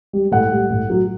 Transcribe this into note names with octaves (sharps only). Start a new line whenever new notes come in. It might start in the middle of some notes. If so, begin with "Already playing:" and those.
G3
A2 F#5
G3
A2
F#3